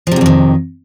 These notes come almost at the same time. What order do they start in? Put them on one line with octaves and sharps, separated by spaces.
F3 C3 G#2 F2 D#3